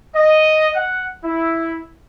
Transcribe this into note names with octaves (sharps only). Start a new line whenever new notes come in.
D#5
F#5
E4